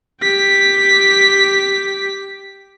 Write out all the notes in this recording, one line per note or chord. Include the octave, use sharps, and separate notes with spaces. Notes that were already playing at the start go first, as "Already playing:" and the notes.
G4 B6